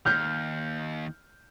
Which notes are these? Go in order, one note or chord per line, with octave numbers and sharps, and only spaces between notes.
D#2 F6 G6